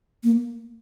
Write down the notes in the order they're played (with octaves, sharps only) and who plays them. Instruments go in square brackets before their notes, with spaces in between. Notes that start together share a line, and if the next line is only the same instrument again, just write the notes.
[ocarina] A#3